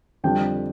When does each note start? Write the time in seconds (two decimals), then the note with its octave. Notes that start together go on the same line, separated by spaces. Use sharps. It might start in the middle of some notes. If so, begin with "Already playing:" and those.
0.24 F2 D3 G3 D4 G5